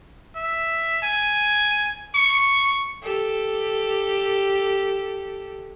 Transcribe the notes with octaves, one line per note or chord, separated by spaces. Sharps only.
E5
G#5
C#6
G4 A4